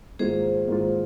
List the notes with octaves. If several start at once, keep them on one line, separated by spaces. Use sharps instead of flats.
G#2 D#3 A#3 F4 G#4 C5
G#2 D#3 A#3 F4